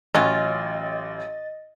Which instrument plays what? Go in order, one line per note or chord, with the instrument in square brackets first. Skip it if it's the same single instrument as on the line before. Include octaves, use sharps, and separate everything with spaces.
[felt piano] A1 [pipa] F#3 C#4 F4 [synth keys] D#5 A6